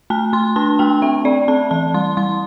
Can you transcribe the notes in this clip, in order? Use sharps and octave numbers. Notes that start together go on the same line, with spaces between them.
A3 A5
A3 C6
D4 A5
A3 G5
C4 E5
C4 D5
C4 A5
E3 A5
G3 C6
G3 C6